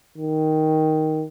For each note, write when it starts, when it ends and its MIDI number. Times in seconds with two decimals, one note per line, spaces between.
0.18 1.24 51